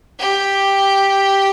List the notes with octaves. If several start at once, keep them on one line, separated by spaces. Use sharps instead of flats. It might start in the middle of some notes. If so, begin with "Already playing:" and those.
G4